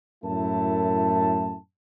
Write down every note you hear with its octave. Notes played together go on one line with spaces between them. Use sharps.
F#2 A2 A3 E4 A#4 A5